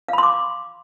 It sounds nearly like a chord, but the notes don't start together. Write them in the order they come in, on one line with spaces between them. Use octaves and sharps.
F5 B5 C6 D6